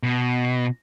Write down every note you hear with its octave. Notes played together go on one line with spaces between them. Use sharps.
B2